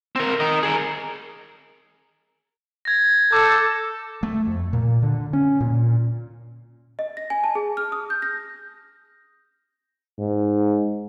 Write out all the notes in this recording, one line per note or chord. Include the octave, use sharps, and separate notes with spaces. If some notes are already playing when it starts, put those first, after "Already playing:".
C4 A#4
A#4 D#5
G#4 A#4
G#6 A#6
A4 D6 G6
A3
F2
A#2
D3
C#4
A#2
D#5
A#6
G#5
A5
G#4
F6
D#6
G6
A#6
G#2